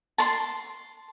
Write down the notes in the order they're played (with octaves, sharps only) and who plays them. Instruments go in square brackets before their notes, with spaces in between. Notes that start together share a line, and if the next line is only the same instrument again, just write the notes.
[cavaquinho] A5 C6